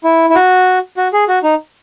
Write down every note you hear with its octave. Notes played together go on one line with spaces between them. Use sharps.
E4
E4
F#4
F#4
G#4
F#4
D#4